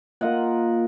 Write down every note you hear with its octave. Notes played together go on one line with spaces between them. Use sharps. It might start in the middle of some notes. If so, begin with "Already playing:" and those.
A#3 F4 D#5 F#5